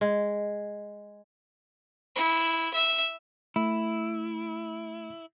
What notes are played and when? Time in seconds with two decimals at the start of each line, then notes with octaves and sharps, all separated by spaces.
0.01 G#3
2.15 E4
2.74 E5
3.56 A3 E4